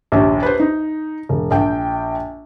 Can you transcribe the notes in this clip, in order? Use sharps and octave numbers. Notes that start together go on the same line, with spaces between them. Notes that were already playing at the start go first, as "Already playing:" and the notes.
A#1 D#2 C#4
B4 C5
D#4
E1
A#1 G5